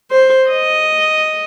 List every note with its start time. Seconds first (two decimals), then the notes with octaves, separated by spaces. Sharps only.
0.11 C5
0.50 D#5